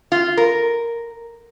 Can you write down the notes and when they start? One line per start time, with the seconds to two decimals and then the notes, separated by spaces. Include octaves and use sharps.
0.12 F4
0.37 A#4